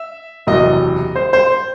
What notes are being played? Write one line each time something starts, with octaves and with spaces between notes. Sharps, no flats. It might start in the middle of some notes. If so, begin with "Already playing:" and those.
Already playing: E5
F#1 E2 C3 F#3 D#5
C5
C5